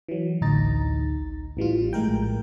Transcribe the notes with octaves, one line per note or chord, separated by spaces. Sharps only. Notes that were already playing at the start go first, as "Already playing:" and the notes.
E3 F#3
A1 D2 D#4 A#5 A6
A1 E3 G3 F4
A#1 A2 G#3 A#4 G5